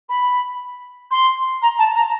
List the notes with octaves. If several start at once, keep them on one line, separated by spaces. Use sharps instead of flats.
B5
C6
A#5
A5
A#5